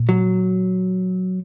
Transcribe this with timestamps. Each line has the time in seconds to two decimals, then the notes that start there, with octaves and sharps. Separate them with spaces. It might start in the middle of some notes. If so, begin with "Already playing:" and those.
Already playing: A#2
0.09 F#3